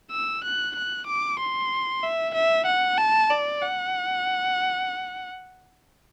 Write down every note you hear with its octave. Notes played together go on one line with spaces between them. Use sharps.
E6
F#6
F#6
D6
C6
E5
E5
F#5
A5
D5
F#5